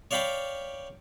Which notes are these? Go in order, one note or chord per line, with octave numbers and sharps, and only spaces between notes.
C#5 D5 F5 G5 B5 D6